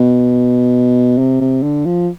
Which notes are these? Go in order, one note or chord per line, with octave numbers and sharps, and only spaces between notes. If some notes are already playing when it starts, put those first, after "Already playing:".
Already playing: B2
C3
C3
D3
F3